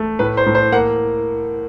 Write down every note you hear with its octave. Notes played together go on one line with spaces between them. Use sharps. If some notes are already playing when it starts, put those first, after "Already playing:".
Already playing: A3
A2 B4
C5
A2
C5
A#3 F#5